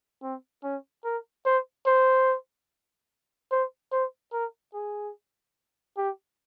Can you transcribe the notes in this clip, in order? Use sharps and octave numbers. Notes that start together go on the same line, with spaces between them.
C4
C#4
A#4
C5
C5
C5
C5
A#4
G#4
G4